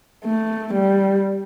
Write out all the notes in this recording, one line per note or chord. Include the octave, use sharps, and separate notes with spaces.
A3
G3